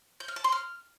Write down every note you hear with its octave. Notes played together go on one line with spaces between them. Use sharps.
G6
F6
A5
C6
F6